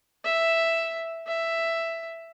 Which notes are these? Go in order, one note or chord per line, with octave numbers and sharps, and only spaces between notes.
E5
E5